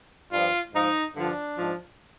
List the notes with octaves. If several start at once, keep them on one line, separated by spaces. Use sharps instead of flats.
G2 F3 F4
G#2 F3 D#4
G2 D3 F3 D4
G#2 F3